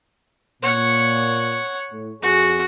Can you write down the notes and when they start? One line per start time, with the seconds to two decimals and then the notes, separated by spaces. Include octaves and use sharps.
0.62 A#2 C#5 F#5
1.92 A2
2.22 F2 F#4 G#4